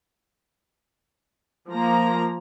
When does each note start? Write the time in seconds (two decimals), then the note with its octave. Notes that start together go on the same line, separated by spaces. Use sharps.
1.70 F3 A#3 A#5